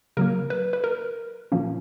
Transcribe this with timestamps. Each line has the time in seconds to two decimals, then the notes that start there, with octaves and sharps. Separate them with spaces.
0.17 C#3 F#3 A#3 A#4
0.50 B4
0.73 B4
0.84 A#4
1.52 A#2 F3 A#3 C#4